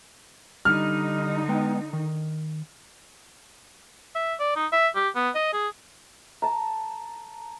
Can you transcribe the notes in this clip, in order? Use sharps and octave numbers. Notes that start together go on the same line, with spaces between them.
D3 G3 D#4 F6
G#3 B3 G5
D#3
E5
D5
D#4
E5
G4
B3
D#5
G#4
A5 A#5